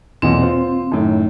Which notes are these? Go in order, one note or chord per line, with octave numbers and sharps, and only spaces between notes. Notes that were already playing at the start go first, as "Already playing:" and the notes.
B1 E2 A#2 C4
F4 C5
F#2 A2 D#3